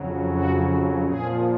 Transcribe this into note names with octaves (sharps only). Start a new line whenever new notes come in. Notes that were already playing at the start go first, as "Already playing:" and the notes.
Already playing: F2 C#3 F#3
F#4
A#2 F3 G#4